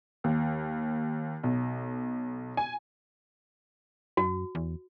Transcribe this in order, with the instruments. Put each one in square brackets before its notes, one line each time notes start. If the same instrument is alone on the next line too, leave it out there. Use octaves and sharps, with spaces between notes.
[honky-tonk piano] D#2
B1
G#5
[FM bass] F#2 [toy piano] F#4
[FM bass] E2